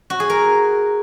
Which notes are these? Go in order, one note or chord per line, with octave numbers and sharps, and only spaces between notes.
F#4
G#4
A#4